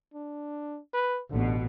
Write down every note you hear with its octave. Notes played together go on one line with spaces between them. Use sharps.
D4
B4
A1 B2 D3